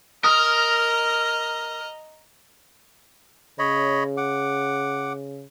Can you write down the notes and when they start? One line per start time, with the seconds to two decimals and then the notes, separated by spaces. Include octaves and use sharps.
0.24 A#4 D#5 A#5 D#6 F6
3.59 C#3 C#5 D#5 B5
4.17 F#5 D6